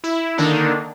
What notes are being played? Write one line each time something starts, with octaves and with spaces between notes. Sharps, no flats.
E4
D3 D#3 A#3 D4 D#4